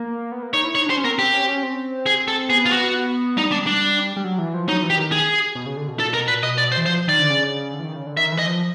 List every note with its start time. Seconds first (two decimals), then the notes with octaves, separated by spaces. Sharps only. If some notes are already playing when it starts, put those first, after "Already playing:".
Already playing: A#3
0.32 B3
0.43 A#3
0.53 D#4 C#5
0.64 E4
0.75 D#4 C#5
0.86 D4 C5
0.97 C#4
1.04 B3 A#4
1.08 C4
1.19 C4 G4
1.33 C#4
1.44 C4
1.48 C#4
1.63 C4
2.06 G#4
2.28 A4
2.50 B3 G#4
2.66 F4
2.72 F#4
3.37 G3 D#4
3.52 D4
3.67 D4
4.16 G3
4.24 F#3
4.38 E3
4.54 F3
4.68 F#3 D#4
4.83 E3
4.90 G4
4.97 D#3
5.12 G#4
5.55 B2
5.66 C#3
5.77 D3
5.88 B2
5.99 A#2 A4
6.14 B2 A#4
6.28 A#2 B4
6.42 B2 D#5
6.58 D5
6.72 C5
6.77 E3
6.86 F3 C5
7.08 D#3 D5
7.19 D3
7.30 C#3
7.74 D3
7.79 E3
7.85 D#3
7.96 C#3
8.06 D3
8.17 D#3 E5
8.32 E3
8.39 D#5
8.47 F3